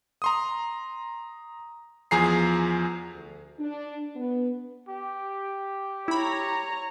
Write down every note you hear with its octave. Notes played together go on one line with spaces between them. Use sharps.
A#5 C6 D#6
E2 F3 G#4 A#5 C7
D2
D4
B3
G4
E4 C#5 A#5 B5